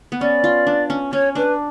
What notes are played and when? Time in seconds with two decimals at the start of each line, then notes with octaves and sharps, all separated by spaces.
0.12 B3
0.20 C#4 D5
0.44 F4
0.67 D4
0.90 C#4
1.12 C#4 C#5
1.35 D4 B4